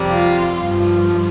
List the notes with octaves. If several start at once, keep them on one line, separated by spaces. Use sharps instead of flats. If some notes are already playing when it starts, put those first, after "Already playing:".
Already playing: F2 C3 G3
F4
G2 F3